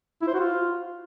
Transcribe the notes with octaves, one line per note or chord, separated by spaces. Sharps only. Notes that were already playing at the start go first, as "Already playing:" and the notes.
E4
C5
F#4
F4